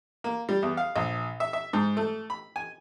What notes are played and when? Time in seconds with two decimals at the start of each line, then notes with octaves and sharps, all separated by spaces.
0.24 A#3
0.49 G3
0.62 E2
0.77 F5
0.96 A#1
1.40 E5
1.53 E5
1.73 G#2
1.97 A3
2.30 B5
2.56 G#5